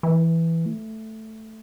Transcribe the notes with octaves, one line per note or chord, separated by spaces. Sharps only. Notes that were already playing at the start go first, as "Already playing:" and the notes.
E3
A3